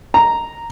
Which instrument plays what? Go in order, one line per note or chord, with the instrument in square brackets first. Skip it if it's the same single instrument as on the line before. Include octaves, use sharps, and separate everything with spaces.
[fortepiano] A#5